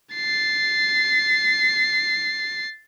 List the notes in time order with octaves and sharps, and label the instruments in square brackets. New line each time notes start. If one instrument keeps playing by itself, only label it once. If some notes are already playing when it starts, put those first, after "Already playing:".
[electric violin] A6 C7